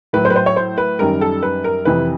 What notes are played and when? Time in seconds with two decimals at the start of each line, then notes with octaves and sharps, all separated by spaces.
0.13 A2 F#3 B4
0.25 C5
0.30 B4
0.36 C5
0.46 C#5
0.56 C5
0.78 B4
0.99 F#2 D#3 G3 A#4
1.21 A4
1.43 B4
1.64 A#4
1.85 F2 C3 E3 B4